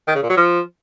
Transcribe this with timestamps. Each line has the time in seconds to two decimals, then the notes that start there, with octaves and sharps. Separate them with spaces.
0.08 D#3
0.15 C#3
0.23 A#2
0.30 F#3
0.37 F3